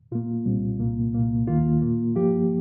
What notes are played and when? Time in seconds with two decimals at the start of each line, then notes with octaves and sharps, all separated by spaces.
0.12 A#2 A#3 F4
0.45 C2 A#2 G3 C4
0.79 C2 A#2 A#3
1.14 C2 A#2 A#3
1.47 D#2 D#3 A#3 F4
1.82 A#2 A#3
2.15 G2 F3 A#3 G4